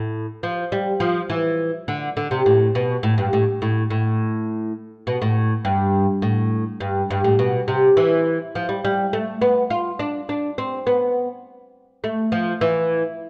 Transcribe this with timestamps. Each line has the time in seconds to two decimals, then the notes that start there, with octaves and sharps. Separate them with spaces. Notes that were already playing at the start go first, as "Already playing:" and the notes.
Already playing: A2
0.43 F3
0.72 G3
1.00 F3
1.30 E3
1.88 D3
2.17 D3
2.31 C3
2.46 A2
2.75 B2
3.03 A2
3.18 G2
3.33 A2
3.62 A2
3.90 A2
5.07 B2
5.22 A2
5.65 G2
6.22 A2
6.80 G2
7.10 G2
7.24 A2
7.39 B2
7.68 C3
7.97 E3
8.55 F3
8.69 G3
8.84 G3
9.13 A3
9.41 B3
9.70 F4
9.99 D4
10.29 D4
10.58 C4
10.87 B3
12.04 A3
12.32 F3
12.61 E3